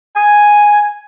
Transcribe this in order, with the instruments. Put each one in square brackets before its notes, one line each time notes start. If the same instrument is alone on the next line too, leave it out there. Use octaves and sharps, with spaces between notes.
[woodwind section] G#5